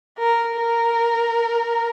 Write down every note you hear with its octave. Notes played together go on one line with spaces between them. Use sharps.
A#4
A#4